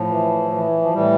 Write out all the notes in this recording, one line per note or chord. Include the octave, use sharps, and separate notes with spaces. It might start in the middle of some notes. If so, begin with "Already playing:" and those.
Already playing: A2 F3
E3
E3
F3
A2 E3 G3